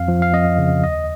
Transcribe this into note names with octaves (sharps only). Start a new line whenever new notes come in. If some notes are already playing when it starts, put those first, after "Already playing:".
Already playing: F2 F5
F3
F5
F2 D#5
C#3
D#2 D#5